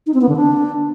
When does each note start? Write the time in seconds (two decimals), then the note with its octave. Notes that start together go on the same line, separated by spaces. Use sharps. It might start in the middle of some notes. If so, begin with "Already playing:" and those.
0.07 D#4
0.14 C4
0.21 B3
0.29 D3
0.36 D4